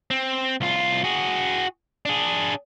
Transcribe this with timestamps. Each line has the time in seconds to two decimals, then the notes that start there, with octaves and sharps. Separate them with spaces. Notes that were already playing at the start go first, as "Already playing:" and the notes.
0.11 C4
0.61 C2 F4
1.04 F#4 G#4
2.05 D4 G#4